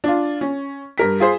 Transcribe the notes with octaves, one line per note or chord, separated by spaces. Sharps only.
D4 F4
C#4
G2 A#4 B6
F4 G#4 C5